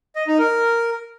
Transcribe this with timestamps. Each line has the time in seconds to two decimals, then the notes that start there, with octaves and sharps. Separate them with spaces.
0.16 D#5
0.27 D#4
0.39 A#4